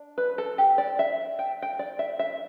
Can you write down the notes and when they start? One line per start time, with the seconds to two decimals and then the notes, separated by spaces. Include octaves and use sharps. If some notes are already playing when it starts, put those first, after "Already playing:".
Already playing: D4
0.18 B4
0.38 A4
0.58 G4
0.78 D5
0.99 E5
1.39 G5
1.62 G5
1.79 D5
1.99 E5
2.19 E5